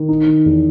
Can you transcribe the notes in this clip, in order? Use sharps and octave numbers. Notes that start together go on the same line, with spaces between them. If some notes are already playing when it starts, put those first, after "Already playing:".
Already playing: D#3
D#4
D#3
E2